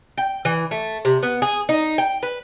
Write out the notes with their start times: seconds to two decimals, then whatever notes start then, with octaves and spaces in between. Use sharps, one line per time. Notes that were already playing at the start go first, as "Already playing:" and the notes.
0.18 G5
0.45 E3
0.71 A3
1.05 C3
1.23 B3
1.42 G#4
1.69 D#4
1.98 G5
2.23 B4